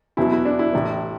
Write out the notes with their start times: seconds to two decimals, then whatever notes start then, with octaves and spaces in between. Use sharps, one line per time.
0.17 E2 B2 F#3 E4
0.32 E4
0.45 D4
0.59 E4
0.73 A1 A2 E3